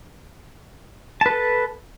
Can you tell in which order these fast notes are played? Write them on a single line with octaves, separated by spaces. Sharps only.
A5 B4 A4